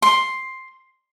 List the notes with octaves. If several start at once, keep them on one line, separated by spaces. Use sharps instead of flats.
C6